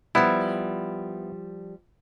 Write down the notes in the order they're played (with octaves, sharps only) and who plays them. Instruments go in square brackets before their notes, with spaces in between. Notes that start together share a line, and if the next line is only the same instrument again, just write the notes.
[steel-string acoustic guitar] F3 G3 [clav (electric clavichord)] B3 E4